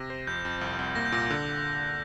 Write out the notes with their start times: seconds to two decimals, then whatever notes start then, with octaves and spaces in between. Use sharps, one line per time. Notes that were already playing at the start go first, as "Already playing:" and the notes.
Already playing: C3 A#6
0.10 C5
0.27 F2 G6
0.45 F2
0.61 C2
0.79 C2
0.95 A#3 A#6
1.05 G6
1.12 A#2 A#6
1.30 D3